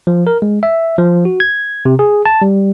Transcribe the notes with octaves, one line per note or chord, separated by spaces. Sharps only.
F3
A#4
G#3
E5
F3
F#4
G#6
C3
G#4
A5
G3